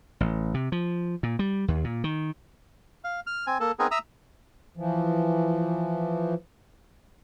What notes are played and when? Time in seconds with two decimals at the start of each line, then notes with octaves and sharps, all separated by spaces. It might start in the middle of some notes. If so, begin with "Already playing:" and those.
0.20 A1
0.54 C3
0.72 F3
1.23 A#2
1.39 G3
1.68 D#2
1.84 A#2
2.04 D#3
3.04 F5
3.27 F6
3.47 C4 G#5
3.60 A#3 A4
3.79 B3 C4 D#4 G#4 A#4
3.91 E5 A#5 D#6 E6
4.77 E3 F3